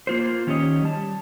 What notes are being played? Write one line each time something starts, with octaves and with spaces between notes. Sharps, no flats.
A#3 F4 C5
D#3 C#4 G4 C#5 D#5
G3 A5